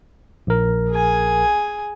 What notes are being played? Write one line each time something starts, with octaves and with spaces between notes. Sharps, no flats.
A#1 A#4
G#4 G#5